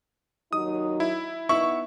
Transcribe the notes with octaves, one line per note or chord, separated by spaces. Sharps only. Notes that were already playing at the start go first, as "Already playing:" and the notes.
D#2 F#3 D#4 D#6
E4
B3 D#4 E4 C#6